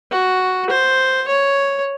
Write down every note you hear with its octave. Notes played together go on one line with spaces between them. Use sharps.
F#4
C5
C#5